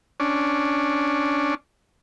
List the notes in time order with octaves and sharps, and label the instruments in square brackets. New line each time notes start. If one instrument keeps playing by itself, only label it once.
[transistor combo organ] C#4 D4